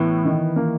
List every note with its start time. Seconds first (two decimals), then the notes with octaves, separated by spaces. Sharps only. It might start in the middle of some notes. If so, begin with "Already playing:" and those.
Already playing: A2 E3 B3
0.25 D#3
0.56 A#3